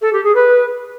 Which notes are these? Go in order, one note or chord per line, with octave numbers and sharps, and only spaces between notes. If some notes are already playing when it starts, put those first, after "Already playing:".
A4
G4
G#4
B4